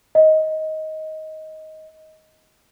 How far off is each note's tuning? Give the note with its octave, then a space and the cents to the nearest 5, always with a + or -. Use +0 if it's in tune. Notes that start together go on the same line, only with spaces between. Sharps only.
D#5 +15